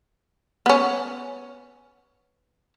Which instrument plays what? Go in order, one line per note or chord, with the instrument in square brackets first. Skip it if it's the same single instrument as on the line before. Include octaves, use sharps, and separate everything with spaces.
[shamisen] B3 C#4